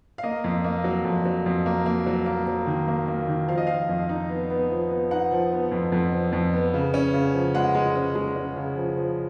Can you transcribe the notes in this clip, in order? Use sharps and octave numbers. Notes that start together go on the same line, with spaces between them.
F5
A#3 D#5
F2
A#3
F#3
F2
F#3
F2
A#3
A#3
F#3
A#3
F#3
D#3
A#3
A#3
D#3
F3 F5
D#5
F3 F5
F2
D#4
B3
B3
F3
B3
D#4 F#5
F3
B3
F2
F2
F3
F2
B3
C#3
C#4
C#3
F3
G#3 F#5
G#3
C#4
G#3
C#4
C#3
F3
F3